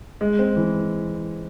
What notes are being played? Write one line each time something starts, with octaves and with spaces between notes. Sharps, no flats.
G#3
C4
E3